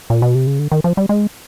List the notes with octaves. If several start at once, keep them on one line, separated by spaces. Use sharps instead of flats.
A#2
B2
C3
C#3
D3
D#3
F3
G3
G#3